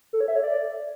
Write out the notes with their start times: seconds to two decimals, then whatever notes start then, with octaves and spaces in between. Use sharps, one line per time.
0.13 A4
0.21 C#5
0.28 E5
0.36 C#5
0.43 D5